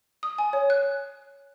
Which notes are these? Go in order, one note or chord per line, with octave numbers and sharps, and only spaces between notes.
D#6
G#5
C#5
F#6